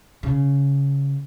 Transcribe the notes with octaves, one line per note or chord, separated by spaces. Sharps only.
C#3